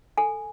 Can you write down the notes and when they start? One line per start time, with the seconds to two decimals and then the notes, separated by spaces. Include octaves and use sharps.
0.18 A4 G#5